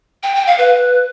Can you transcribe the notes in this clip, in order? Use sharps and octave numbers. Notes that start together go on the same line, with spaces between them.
G5
G5
F5
B4